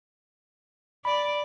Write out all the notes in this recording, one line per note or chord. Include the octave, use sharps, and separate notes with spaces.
D5 B5